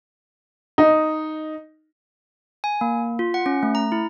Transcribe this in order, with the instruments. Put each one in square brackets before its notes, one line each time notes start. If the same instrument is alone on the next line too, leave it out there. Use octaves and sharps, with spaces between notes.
[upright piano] D#4
[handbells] G#5
A#3
F4
F#5
C#4
A3
A#5
E4